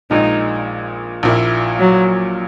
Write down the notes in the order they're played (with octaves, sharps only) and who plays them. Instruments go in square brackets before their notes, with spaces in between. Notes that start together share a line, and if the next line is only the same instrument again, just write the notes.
[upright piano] A#1 A#2 G#3 [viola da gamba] D#4
[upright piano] A#1 A#2 A#3 E4
[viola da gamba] F#3